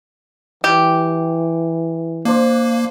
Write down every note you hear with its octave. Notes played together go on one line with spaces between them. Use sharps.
E3 G3 G4
A#3 D4 C5